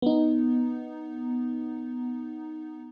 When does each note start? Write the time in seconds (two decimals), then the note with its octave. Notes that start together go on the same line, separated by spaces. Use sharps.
0.02 B3 D#4